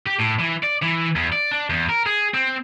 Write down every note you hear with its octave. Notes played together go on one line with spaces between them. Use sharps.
G4
A2
E3
D5
E3
E2
D5
D4
E2
A#4
G#4
C4